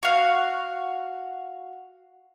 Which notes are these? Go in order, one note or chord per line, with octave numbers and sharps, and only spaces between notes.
F#4 F5